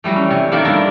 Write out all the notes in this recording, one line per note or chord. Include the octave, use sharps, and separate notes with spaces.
E3 F#3 G3 A3
C#4
C3
D#3 A#3 A4 D5 E5 F5
G2 A#3 D4 E4